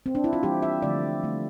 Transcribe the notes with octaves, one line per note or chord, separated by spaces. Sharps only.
C4
D4
E4
F4
E3 G3 A#3 G4
E5
D3 F3 A3 D5
D3 A3 C4